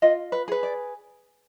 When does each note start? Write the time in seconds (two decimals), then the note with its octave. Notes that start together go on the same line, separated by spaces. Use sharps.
0.02 F4 D#5
0.32 B4
0.48 G#4 B4
0.63 D5